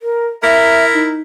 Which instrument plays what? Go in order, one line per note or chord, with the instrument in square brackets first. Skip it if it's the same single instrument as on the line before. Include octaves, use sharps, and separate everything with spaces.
[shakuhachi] A#4
[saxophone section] E4 A#4 [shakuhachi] E5
[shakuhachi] D#4